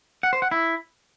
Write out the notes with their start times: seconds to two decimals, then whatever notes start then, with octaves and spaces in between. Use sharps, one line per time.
0.23 F#5
0.33 C5
0.42 F#5
0.51 E4